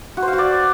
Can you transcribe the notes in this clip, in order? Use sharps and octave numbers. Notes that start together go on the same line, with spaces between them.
F#4
C5
F5
F#4
D5